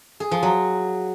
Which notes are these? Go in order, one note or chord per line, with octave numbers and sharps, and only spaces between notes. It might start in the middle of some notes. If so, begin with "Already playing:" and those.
G#4
F3
F#3